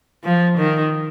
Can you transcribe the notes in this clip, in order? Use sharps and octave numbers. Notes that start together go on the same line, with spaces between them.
F3
D#3